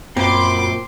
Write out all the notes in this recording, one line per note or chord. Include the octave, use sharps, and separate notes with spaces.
F#2 A#2 C4 B5 C6 D6